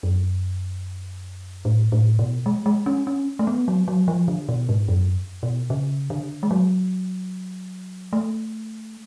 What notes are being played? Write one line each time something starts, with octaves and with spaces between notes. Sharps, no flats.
F#2
A2
A2
B2
G#3
G#3
C#4
C#4
A3
B3
F#3
F#3
F3
D3
B2
G#2
F#2
B2
C#3
D3
G#3
F#3
A3